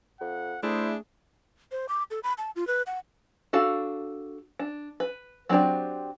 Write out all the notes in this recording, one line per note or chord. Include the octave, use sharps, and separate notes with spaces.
F2 F#5
A3 D4 E4 G#4 C5
C5
D6
A4
B5
A5
F4
B4
F#5
D4 F#4 A4 F5
D4
B4
F#3 C4 D4 G4 D5